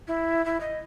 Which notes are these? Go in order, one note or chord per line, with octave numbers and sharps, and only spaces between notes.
E4
E4
D#5